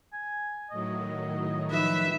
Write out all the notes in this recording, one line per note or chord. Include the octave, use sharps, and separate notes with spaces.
G#5
A2 D#3 F#3 D#5
F3 D#4 B4 E5